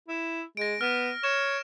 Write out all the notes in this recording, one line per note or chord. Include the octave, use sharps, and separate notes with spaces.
E4
G#3 A#6 D7
B3 F6
C#5 E7